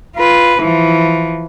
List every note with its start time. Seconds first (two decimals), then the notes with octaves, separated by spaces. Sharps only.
0.17 F4 B4
0.61 E3 F3